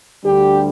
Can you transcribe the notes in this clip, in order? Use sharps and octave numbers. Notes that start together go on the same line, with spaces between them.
D2 D3 G3 D4 G4